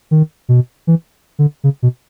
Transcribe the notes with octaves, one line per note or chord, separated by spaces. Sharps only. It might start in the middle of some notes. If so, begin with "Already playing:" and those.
D#3
B2
E3
D3
C#3
B2